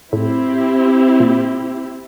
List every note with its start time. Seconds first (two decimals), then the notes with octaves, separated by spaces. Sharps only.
0.13 A2 C4 E4 G4
1.20 A#2